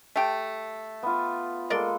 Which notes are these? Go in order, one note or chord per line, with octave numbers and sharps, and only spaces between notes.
A3 G4
B3 F4
G#3 A#3 A4 A#4 D5 C6